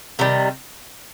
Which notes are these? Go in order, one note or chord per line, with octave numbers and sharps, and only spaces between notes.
C3 D#3 G3